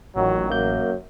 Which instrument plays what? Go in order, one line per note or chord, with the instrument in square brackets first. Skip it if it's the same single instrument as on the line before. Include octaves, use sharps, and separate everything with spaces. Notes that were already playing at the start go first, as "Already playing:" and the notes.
[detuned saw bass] A1 [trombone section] A#2 D#3 F#3
[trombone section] F#2 [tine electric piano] A#3 G6